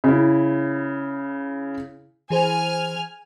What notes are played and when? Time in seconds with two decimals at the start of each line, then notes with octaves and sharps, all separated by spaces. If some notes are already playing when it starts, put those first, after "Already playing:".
0.04 C#3 E4
2.30 E3 G#4 C5 G#5 F6